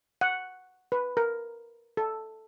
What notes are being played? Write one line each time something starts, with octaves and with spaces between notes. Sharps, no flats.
F#5
B4
A#4
A4